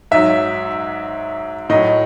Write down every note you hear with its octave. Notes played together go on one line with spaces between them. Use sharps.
G#2 F#3 E5
A2 F#3 D#5